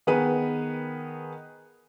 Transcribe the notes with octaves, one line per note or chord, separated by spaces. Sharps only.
D#3 B3 G#4 B4 D#7